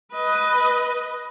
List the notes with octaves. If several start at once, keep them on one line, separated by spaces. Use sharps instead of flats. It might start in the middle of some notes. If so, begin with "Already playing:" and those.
B4 D#5